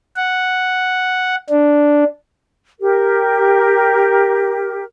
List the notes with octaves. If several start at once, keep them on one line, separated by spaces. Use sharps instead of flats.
F#5
D4
G4 A#4